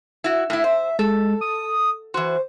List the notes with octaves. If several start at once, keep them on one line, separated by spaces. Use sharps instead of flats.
E4 F#4
A2 E4
C5 E5
G#3 A4
D#6
E3 F#4 C5